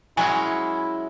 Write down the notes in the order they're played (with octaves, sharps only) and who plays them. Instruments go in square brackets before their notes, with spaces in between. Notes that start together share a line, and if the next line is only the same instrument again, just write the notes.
[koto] F#3 G#3 C#4 [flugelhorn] E4 [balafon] G#5